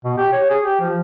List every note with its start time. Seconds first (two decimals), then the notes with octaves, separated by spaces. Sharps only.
0.04 B2
0.18 G4
0.33 C#5
0.50 G#4
0.64 G4
0.81 F3